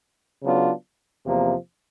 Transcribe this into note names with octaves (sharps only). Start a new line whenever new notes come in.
C#3 F#3 B3 D4 F4
E2 C3 F3 A#3